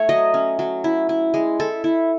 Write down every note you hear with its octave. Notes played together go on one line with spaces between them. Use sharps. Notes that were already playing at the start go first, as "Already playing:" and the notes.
Already playing: A3 C#5
F#3 D#5
C#4
F#3
E4
E4
G#3
E4 A4
E4